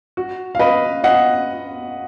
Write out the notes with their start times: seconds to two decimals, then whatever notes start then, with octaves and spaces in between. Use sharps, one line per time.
0.17 F#4
0.55 F5
0.59 B4 D#5
1.04 D#5 F#5